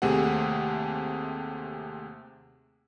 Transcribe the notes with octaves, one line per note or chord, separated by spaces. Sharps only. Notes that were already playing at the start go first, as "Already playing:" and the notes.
D#2 C3 A3 G4 G#4 F#5